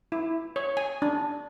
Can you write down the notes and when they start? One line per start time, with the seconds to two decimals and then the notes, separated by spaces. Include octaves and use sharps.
0.12 E4
0.56 C#5
0.77 G#5
1.02 D4